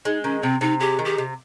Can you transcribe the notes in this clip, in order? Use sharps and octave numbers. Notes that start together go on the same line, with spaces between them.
G#3 D#4
D#3 C#4
C3 C4
C3 D#4
G#3 G4
D#3
G4
C3